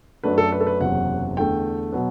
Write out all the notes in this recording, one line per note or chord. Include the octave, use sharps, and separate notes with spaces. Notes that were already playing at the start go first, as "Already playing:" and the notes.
F#2 F#3 A3 D4 B4
A4
B4
A4
B4
F#1 E2 C3 F#3 F#5
E2 D3 A3 G5
B2 F#3 B3